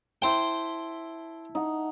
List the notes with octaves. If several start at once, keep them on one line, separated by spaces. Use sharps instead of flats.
E4 C5 G5 A5
D#4 F#5